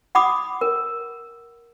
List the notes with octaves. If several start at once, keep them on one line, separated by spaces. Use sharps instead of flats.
F#5 B5 D6 D#6
A#4